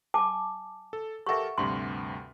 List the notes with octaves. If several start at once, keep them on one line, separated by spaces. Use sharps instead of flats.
G#5 A5 D6
A4
G4 A4 A#4 E5 F#5 C#6
D2 G2 C3 C6